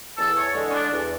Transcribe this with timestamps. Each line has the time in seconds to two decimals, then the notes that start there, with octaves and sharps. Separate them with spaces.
0.18 E2 A4
0.36 C#5
0.55 D3 G#3
0.69 C#4
0.73 D4
0.91 E2